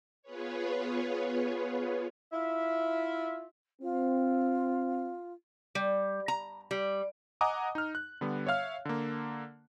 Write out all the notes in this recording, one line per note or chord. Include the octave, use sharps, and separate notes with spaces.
B3 F4 G#4 B4 C#5
E4 F4 E5
C4 F4
G3
A#5
G3
D#5 F#5 G#5 A#5 D6 D#6
D#4 F6
F#6
D3 G3 B3
C#5 E5 F5 F6
D3 A#3